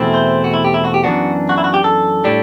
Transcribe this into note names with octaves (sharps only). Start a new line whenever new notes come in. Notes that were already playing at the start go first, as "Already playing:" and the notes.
Already playing: E2 B2 A3 C4 E4
C5
F#4
E4
G4
E4
F#4
G4
F#2 E3 B3 D4 F#4
F#4
E4
F#4
G4
A4
A2 G3 D4